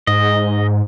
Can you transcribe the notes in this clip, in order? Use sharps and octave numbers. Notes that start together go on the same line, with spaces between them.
G#2 D#5